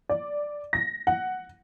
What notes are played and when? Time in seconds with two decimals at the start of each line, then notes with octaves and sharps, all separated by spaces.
0.09 D5
0.73 A#6
1.07 F#5